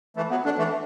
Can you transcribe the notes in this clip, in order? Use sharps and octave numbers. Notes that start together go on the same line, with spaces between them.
E3 A3
F#3 B3
A3 D4
E3 A3